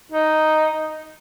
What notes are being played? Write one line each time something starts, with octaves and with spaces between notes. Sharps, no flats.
D#4